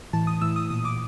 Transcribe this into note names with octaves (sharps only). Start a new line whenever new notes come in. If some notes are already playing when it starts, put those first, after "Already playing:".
A2 E3 A5
D#6
A2 E3 E6
D#6
A#2 D#6
D6